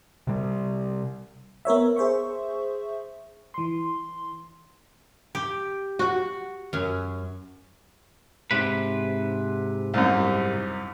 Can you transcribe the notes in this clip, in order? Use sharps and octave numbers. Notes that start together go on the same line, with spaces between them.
C3 G3
B3 A#4 C#5 E5
G#4 C5 E5 C#6
E3 C6
G4
F#4 F#5
F#2 C#4
G#2 C3 B4
C2 F#2